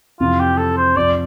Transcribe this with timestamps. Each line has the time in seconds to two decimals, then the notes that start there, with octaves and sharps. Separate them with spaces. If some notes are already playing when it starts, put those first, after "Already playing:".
0.20 F2 C3 E3 F4
0.40 G4
0.57 A4
0.77 C5
0.96 F2 C3 F3 D5